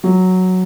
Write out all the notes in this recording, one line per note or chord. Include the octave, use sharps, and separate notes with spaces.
F#3